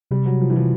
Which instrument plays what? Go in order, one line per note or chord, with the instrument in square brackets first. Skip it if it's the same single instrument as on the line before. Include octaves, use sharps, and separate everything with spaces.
[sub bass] C3 [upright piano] G3
[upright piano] F#3
F3
E3
F3